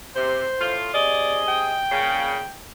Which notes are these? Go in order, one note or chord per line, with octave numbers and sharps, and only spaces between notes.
C3 C5
A2 F4
C3 G#4 D5 D#5
G5
A#2 C#3